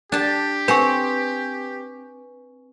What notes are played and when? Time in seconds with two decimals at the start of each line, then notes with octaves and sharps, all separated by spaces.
0.12 D4 G4 A5
0.68 C4 B4 C5 G#5 C#6